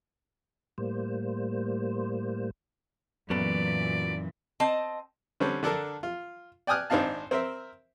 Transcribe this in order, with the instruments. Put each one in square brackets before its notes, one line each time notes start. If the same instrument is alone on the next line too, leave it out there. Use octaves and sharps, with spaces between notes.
[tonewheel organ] A2 G3 A#3 C5
[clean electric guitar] F#2 [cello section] A#2 E3 [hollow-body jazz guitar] F#3 B3 A4 [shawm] D5
[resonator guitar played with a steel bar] C4 D#5 A5
[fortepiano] D3 G3 C4 C#4
D3 D4 A4 A#4
F4
D5 G5 G#5 D#6 F6 F#6
G#1 C4 D4 D#4 F5 A5
C4 A#4 C5 E5